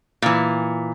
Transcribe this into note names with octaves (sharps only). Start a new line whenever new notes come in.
A#2 E3